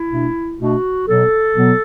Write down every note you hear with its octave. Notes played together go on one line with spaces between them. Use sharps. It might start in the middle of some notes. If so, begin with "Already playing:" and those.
Already playing: E4
B2 A3 D4
B2 A3 D4 F#4
B2 F#3 B3 A4
B2 F#3 B3